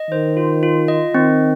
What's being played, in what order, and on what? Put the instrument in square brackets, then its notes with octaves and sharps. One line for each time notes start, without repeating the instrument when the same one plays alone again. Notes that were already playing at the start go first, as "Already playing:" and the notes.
Already playing: [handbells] D#5
[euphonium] D#3 [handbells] C5
[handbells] F4
F4
D#5
[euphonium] D#3 [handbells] C4